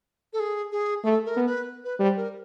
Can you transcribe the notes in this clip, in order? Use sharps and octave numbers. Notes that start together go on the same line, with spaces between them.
A4
G#4
G#4
A3 A4
A#4
B3
B4
B4
G3 C5
A#4